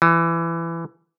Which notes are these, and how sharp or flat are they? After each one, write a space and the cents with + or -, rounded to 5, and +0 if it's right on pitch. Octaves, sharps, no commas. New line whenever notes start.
E3 +20